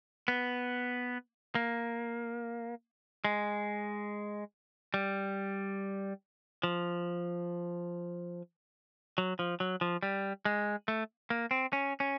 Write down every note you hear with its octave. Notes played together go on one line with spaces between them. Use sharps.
B3
A#3
G#3
G3
F3
F#3
F3
F#3
F3
G3
G#3
A3
A#3
C4
C#4
C#4